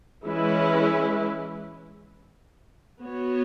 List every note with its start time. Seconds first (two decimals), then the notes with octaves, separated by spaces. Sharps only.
0.24 E3 G#3 C#4 E4 B4
3.03 B3 F#4 C#5